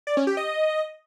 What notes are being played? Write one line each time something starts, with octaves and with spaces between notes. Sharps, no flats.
D5
C#4
G4
D#5